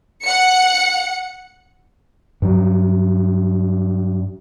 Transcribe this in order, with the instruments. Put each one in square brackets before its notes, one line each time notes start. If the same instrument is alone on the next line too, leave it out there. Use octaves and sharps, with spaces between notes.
[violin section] F#5 C#7
[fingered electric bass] G2 F#3